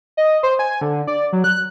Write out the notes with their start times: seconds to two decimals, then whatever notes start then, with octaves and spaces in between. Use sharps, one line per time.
0.17 D#5
0.43 C5
0.59 G#5
0.81 D3
1.07 D5
1.33 F#3
1.44 F#6